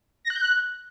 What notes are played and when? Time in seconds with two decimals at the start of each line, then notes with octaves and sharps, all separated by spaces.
0.25 A#6
0.30 F#6
0.36 G6
0.41 F#6